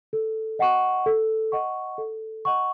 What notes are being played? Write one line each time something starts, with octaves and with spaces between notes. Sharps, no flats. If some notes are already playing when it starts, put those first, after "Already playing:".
A4
D#5 F#5 C#6
A4
D#5 F#5 C#6
A4
D#5 F#5 C#6